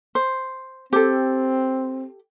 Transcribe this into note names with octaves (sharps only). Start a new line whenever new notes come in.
C5
C4 G4 A4